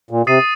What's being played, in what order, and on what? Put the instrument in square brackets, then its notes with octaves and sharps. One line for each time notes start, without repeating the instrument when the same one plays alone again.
[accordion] A#2
[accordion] C3 [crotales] D#6 A6 C7 D#7